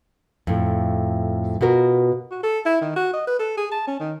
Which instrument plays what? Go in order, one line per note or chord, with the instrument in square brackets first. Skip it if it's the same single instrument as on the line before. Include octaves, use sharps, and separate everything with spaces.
[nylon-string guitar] F2 A2
B2 F4 F#4 A#4
[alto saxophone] F#4
A4
E4
D#3
F#4
D#5
B4
A4
G#4
A5
C#4
D#3